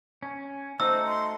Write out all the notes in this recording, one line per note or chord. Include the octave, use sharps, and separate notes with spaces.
C#4
A3 D#4 F#4 C5 E6
C6